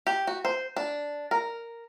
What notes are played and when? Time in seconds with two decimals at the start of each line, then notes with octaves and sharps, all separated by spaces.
0.07 G4
0.27 F#4
0.45 C5
0.76 D4
1.31 A#4